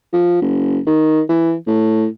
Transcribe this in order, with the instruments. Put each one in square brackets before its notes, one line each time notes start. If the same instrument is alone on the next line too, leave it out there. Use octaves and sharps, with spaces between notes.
[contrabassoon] F3
F#1
D#3
E3
A2